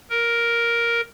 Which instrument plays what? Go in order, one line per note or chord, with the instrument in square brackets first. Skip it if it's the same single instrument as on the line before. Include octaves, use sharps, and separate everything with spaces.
[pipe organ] A#4